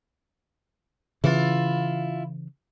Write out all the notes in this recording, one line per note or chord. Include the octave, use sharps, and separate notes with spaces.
C#3 E3 E4 F4